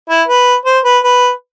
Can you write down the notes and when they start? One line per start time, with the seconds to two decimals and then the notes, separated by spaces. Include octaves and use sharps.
0.09 E4
0.28 B4
0.66 C5
0.84 B4
1.04 B4